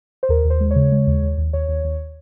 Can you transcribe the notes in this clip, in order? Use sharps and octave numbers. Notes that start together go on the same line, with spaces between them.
C5
D#2 A#4
D#2
C5
G#3
C#3 C#5
G#3
D#2
D#2
D#2
D#2 C#5
D#2
D#2